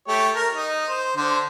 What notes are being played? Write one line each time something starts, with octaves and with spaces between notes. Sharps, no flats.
A3 G4 C#5
A#4
D#4
C5
D3 C5